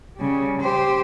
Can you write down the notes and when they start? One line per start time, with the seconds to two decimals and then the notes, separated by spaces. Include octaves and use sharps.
0.17 C#3 G3
0.61 G4 C5